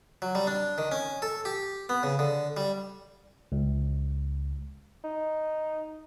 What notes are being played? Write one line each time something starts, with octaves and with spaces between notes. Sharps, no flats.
F#3
G3
D4
D#3
C#4
A4
G4
B3
C#3
D3
G3
C#2
D#4